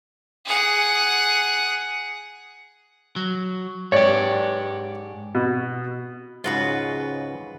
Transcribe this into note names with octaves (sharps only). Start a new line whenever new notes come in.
G#4 F#5
F#3
G#2 G4 C#5 D5
B2
C#2 G#2 C#3 F4 F#4 B4